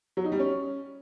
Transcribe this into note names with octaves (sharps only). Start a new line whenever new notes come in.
F#3
D#4
G3
C#4